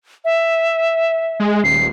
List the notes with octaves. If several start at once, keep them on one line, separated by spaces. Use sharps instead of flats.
E5
G#3
D#1 C7